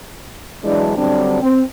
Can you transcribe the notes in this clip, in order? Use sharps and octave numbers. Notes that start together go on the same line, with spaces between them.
E3 F#3 G#3 D4
D3 F#3 G3 C4 D4
C4